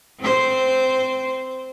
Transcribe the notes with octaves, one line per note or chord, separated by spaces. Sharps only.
C4 C5